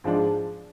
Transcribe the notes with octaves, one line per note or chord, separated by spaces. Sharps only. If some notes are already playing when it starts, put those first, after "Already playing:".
G#2 F3 G#3 D4